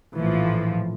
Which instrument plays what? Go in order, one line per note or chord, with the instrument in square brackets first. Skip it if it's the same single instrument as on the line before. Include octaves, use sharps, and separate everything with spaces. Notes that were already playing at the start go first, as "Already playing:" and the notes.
[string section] A#1 A2 F3 [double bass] E3